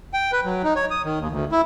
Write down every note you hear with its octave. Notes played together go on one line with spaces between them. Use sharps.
G5
B4
F#3
D#4
C#5
D#6
D#3
D#2
D2
E4